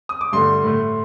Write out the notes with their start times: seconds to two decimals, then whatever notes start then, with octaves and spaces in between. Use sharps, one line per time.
0.09 D#6
0.21 D6
0.33 G2 D3 A3 C6
0.64 A2 A3